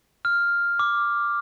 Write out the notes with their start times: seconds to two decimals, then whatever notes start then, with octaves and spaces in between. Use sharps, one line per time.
0.25 F6
0.79 D6